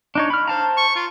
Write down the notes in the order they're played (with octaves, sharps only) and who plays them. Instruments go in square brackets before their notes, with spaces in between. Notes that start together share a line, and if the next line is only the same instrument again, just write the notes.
[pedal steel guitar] D4 D#4 C#5
B5 F6
[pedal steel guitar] C5 A5 A#5 [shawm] F5
[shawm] C#6
F4